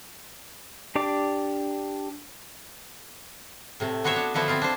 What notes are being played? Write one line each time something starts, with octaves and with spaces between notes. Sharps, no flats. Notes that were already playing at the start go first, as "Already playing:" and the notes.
D4 G4 D5 D6
A2 C3 A3
B3 F#4 C5 C#5 E5
D4
D3 F3 B3 E4 F#4
C4 E4 F4
D4 C5